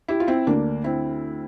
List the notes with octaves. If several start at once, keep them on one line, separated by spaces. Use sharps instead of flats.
E4 G4
F4
C4 E4
D2 D3 A#3 D4
C4 E4